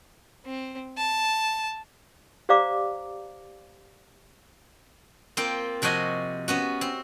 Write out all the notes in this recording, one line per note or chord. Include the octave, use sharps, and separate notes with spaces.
C4
A5
G4 C5 D5 F5 A#5 D6
A#3 C4 F4 G5
C3 F3 F#4 D#5 G#5
B3 C#4 F#4
C4